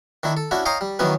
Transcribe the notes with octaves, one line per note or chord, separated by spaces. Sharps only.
D#3 D4 E4
A4
C#4 D4 E4 F#4
C#5 D#5 F5 G5 A#5 C6
G3
D#3 E3 F#3 B3 C#4